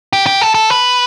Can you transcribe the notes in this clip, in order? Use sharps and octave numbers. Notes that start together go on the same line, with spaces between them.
G4
G4
A4
A4
B4